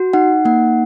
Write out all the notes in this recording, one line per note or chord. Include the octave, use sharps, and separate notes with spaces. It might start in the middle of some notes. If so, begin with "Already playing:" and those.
Already playing: F#4
D#4 F#5
A#3 F#5